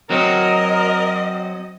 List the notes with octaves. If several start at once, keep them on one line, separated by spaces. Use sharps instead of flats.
F#3 C4 F#4 A#4 D#5